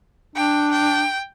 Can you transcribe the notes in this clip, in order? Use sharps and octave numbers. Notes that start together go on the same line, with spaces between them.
D4 G5
G5